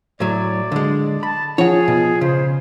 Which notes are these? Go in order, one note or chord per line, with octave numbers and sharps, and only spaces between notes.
A2 F#3 D5
D3 G#3
A5 B5
F3 G#4 C#5 F#5
B2
C#3 C5